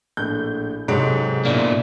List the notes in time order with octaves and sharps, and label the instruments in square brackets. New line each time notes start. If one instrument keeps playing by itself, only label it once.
[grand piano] A#1 A2 [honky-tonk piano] G6
[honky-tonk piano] G#2 [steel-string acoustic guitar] C3 F#3 [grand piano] A4 D7
[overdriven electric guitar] B2 A#3 [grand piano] D4 E4